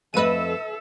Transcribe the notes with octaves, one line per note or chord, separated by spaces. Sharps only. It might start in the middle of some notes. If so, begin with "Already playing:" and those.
F2 A3 A4 B4 D#5 E5 D#7